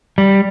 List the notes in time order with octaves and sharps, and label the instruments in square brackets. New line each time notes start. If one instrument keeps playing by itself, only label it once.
[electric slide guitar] G3